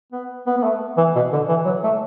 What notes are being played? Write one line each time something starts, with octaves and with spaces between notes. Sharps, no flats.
B3
B3
B3
A3
E3
B2
D3
E3
F#3
A3